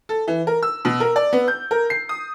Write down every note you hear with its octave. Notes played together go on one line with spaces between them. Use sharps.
A4
E3
A#4
E6
B2
A#4
D5
B3
G6
A#4
C7
D#6